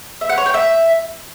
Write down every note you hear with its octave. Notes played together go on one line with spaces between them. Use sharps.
E5
F#5
C#5
G5
E5